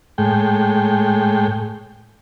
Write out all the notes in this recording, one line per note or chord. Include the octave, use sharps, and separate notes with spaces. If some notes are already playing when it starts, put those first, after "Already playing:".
A2 G#3 G5